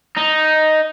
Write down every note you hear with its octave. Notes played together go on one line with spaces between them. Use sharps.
D#4